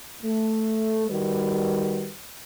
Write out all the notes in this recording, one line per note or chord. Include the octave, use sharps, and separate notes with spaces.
A3
D#3 G3 F#4 B4